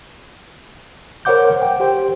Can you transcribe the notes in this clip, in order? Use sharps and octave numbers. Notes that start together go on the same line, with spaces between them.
A#4 C5 C#5 F#5 D6 G6
G5
G4 C5 G5